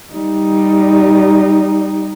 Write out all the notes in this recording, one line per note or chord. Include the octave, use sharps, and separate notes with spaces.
G3 D#4